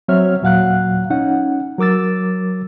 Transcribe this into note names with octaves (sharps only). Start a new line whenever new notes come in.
F#3 C4 C#5 E5 F6
D#2 A#2 F#3 F5 F#5 F#6
C#4 D#4 F#5
F#3 A#4 D6 E6 A6